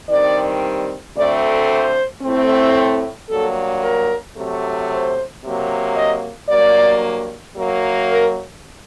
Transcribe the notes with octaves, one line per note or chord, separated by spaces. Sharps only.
G2 D#3 G3 C4 D5
D2 D3 A3 C4 D5
C5
A2 A3 C4
G2 F#3 A#3 A4
A#4
C3 F#3 A3
C5
C3 F#3 A#3
D#5
G2 F#3 A#3 D5
F#2 F#3 A#3
A#4